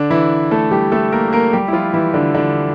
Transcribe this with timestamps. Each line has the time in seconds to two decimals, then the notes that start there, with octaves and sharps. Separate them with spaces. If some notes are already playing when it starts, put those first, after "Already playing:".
Already playing: D3 D4
0.10 E3 E4
0.51 A3 A4
0.71 G3 G4
0.92 A3 A4
1.12 A#3 A#4
1.33 A#3 A#4
1.53 G3 G4
1.68 E4
1.73 F3 F4
1.94 E3 E4
2.14 D3 D4
2.35 D3 D4